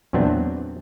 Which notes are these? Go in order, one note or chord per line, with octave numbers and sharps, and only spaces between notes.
E2 A#2 F#3 B3 C4 D4